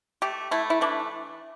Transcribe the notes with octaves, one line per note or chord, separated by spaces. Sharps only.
A3 G4
A3 E4
E4
E3 D4